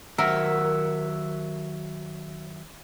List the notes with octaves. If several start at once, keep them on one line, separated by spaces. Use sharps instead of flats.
D#3 F#3 A#4 E5 F#5